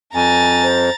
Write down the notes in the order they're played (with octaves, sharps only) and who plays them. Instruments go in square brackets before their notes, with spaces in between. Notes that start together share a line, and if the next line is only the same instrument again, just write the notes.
[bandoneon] F2 [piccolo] G#5 [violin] A#5 A6
[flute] C5